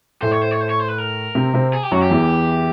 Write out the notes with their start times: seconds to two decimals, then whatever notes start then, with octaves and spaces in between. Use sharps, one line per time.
0.22 A2 A3 C5
0.31 C#5
0.41 C5
0.51 C#5
0.60 C5
0.70 C#5
0.79 C5
0.88 B4
0.98 A#4
1.35 C3 C4
1.54 C3 C4
1.73 G#4
1.83 G4
1.91 F#2 F#3 F#4
2.02 G4
2.10 E2 E3